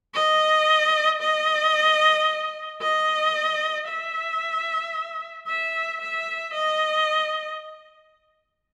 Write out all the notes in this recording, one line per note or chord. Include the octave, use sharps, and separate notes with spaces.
D#5
D#5
D#5
E5
E5
E5
D#5